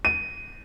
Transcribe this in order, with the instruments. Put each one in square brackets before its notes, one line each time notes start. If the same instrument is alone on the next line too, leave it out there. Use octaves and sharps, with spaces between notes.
[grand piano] D#7